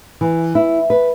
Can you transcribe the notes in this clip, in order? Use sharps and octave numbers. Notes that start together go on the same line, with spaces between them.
E3
E4
B4